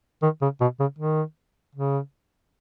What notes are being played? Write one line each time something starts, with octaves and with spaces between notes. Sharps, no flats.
D#3
C#3
B2
C#3
D#3
C#3